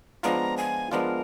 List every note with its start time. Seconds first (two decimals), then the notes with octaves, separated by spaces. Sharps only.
0.23 F3 G#3 B3 D4 F4 A#5
0.58 G#5
0.92 F3 G#3 B3 D4 F4 A#4